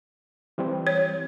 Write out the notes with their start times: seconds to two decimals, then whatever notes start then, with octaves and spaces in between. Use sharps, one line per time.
0.58 E3 G3 C4
0.87 C#5